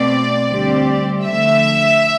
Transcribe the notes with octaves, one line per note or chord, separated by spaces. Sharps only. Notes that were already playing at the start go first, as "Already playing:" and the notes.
Already playing: B2 A3 C4 D5
D2 D3 G3 C4 G4
D3 F3 A3 E5